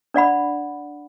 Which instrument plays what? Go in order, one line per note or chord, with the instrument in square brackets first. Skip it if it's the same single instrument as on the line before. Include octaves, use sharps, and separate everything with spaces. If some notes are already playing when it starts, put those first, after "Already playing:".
[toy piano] D4 D5 F#5 B5